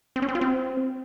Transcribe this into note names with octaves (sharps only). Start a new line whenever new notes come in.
C4
C#4
C4
F4
C4